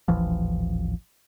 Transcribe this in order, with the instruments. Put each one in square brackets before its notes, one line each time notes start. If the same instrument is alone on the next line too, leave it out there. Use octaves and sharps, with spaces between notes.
[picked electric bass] D#1 A1 E3 F3